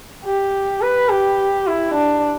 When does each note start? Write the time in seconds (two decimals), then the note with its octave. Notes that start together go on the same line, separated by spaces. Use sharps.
0.25 G4
0.81 B4
1.09 G4
1.67 E4
1.94 D4